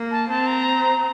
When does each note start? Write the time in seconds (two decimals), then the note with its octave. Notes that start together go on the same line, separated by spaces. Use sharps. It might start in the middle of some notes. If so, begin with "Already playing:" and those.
Already playing: A#3
0.11 A5
0.29 C4 A5
0.47 A#5